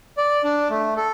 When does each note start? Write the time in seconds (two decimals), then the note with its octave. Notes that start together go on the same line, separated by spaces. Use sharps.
0.17 D5
0.44 D4
0.70 A3
0.96 A4